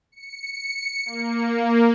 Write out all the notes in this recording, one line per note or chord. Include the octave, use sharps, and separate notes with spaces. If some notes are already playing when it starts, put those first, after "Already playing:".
C#7
A#3